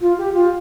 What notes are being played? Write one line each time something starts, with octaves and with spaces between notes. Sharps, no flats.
F4
G4
F4